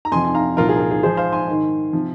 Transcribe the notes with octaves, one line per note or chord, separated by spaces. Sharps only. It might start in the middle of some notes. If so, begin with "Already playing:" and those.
A#5
F2 C3 F3 G#5 C6
G#5
F5 A#5
C2 A#2 F3 F4 A#4
G#4
A#4
G#4
G#4
G#2 F3 G#4 C5
C5 F5
G#5 C6
G#2 D#3
C3 F3